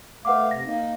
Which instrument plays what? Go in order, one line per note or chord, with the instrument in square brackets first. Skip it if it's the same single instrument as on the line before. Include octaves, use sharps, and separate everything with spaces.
[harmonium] A3 F5 [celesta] B4 F#5 D6
[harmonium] C3 [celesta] A#6
[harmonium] A#3 D#4